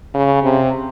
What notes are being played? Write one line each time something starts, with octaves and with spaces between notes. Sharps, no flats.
C#3
C3